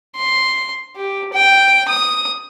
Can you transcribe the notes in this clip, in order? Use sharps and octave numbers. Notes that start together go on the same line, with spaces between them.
C6
G4
G5
D#6